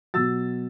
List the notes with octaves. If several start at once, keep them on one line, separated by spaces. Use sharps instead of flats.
B2 F#3 E6 A6